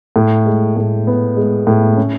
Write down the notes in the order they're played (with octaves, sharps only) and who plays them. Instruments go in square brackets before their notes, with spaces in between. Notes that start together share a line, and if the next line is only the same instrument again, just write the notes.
[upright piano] A2
G#3
A2
B3
G#3
A2
C#4